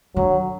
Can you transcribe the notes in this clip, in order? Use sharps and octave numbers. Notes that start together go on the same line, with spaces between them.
D3 F#3